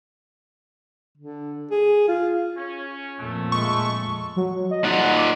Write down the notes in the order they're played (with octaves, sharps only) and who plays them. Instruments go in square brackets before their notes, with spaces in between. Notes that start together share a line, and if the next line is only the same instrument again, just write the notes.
[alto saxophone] D3
G#4
F4
[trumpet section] C#4
[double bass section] F2 A#2 [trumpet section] A3
[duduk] G#3 [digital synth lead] C#6
[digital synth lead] F#3
D#5
[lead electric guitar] A#2 D#4 [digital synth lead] F#5
[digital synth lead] D6